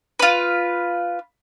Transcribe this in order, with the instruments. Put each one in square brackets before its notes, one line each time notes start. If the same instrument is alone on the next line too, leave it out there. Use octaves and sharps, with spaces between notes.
[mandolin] F4 B4